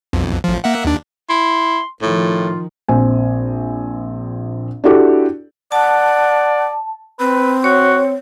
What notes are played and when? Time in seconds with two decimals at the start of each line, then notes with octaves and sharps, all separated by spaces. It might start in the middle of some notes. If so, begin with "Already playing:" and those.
0.13 B1 F2
0.44 A1 F3
0.64 A#3 E5 F#5
0.85 D#2 D4
1.29 E4 C6
2.02 A2 D#3 F3 F4
2.88 A#1 C4 G#5
4.84 D4 E4 F#4 G4 A4
5.72 D5 F#5 A5
7.20 C4 B4
7.64 F#4 C#5